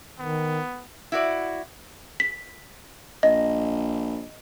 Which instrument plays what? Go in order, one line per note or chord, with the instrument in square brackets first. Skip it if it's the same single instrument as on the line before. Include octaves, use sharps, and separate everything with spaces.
[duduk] D#3 [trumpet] B3
[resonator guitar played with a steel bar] E4 F#4 D5
[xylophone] B6
[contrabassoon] A#1 [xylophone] D#5